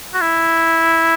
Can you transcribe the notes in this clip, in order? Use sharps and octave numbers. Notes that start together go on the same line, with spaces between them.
F#4
E4